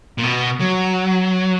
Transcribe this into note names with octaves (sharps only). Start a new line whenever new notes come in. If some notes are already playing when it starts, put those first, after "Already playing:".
A#2
B2
F#3